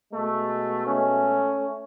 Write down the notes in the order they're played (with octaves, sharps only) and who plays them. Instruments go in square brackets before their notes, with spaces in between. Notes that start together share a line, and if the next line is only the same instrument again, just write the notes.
[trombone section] B2 G#3 A3
A3 C#4